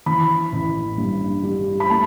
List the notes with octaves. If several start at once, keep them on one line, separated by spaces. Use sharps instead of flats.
E3 B5
A1
G2
G3
B5
A3 A5